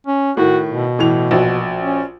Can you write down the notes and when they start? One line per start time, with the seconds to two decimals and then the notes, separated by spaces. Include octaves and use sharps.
0.07 C#4
0.37 A2 D#3 F#4
0.69 B2
0.99 A2 E3 F7
1.31 A#1 F#4
1.81 C#4